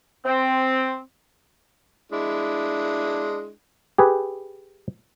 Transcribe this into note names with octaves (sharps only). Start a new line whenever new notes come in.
C4
G#3 D4 E4
G4 G#4 B4